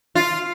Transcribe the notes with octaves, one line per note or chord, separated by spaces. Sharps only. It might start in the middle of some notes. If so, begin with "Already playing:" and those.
F4